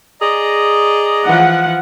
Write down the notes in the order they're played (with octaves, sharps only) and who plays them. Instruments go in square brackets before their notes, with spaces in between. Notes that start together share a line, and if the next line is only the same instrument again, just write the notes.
[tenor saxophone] G#4 [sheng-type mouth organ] D5 D#5 A#5
[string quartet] E3 F3 [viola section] F#5